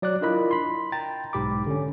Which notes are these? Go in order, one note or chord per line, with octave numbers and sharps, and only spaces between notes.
F#3 D5 D6 F#6
D4 E4 F4 A#4 D#5 B5
B5 C6
G5 A#5 A6
B1 G#2 G4 B5 D6
D3 C#4